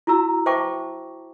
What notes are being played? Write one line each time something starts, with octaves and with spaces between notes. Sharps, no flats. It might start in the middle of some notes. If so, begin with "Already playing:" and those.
E4 F#4 A#5 E6
C5 E5 G5 A5 C#6 D6